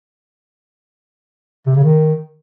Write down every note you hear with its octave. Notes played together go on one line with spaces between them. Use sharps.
C3
C#3
D#3